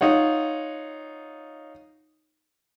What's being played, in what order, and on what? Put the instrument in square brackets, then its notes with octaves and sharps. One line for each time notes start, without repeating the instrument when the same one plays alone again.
[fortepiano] D#4 F4 C#5 F#5